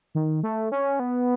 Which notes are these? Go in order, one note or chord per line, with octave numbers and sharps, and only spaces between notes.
D#3
A3
C#4
B3